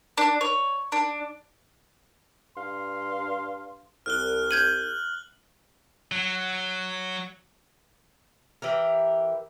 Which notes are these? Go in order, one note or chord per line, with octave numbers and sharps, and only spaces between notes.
D4
C#5
D4
G2 F5 C6
C2 F6 F#6 G7
G6 G#6 D#7 F#7
F#3
E3 G4 A#4